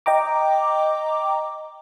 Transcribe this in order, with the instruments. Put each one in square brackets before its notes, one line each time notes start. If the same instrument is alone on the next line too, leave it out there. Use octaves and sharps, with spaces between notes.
[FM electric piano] D#5 G5 A#5 D6